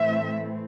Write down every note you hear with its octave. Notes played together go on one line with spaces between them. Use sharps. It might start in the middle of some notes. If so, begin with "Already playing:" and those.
Already playing: A2 E3 A3 C4 E5